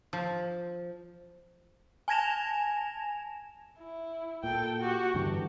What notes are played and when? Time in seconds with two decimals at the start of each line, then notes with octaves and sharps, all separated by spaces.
0.13 F3
2.08 G#5 A5 G#6 A#6 E7 F7
3.79 E4
4.44 A#2 A4 G5
4.81 F#4 G4
5.15 G2 D3 E3 G4